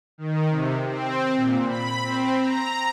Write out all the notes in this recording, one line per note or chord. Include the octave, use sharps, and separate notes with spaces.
D#3
C3
C4
A#2
B5
C4
A#5